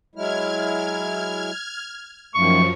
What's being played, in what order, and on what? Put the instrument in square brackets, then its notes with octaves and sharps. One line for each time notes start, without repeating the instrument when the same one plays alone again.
[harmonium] F#3 G#3 E4 [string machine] F6 G#6
[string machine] F#2 F3 [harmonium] D#3 A3 A#3 [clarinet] C#6